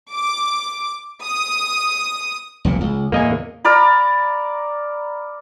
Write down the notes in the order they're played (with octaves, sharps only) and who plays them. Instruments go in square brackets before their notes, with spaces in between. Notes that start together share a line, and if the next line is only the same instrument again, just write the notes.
[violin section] D6
D#6
[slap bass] F1 B1 A#2
C#2
[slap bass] E2 A2 [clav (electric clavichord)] A#3 D#5 G#5
[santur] A#4 D5 A#5 B5